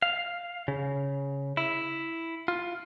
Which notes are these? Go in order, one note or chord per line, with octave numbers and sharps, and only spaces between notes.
F5
C#3
E4
F4